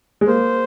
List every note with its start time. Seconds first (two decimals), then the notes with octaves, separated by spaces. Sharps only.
0.21 G#3
0.27 A#3 C5